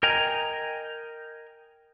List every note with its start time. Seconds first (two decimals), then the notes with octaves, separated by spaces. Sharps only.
0.03 A#4 D#5 G5 G#5 A#5